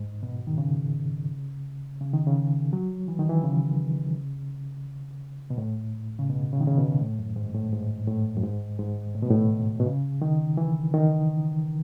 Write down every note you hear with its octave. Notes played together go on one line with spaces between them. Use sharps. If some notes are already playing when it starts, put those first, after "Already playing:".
Already playing: G#2
B2
D#3
C#3
C#3
D#3
C#3
F#3
E3
D#3
E3
C#3
B2
A2
C#3
B2
C#3
D#3
C#3
B2
A2
F#2
G#2
A2
G#2
A2
F#2
G#2
G#2
A2
B2
A2
B2
C#3
D#3
E3
D#3